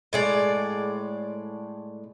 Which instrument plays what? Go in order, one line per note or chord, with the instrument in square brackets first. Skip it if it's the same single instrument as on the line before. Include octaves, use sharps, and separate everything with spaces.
[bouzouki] A2 G#3 D5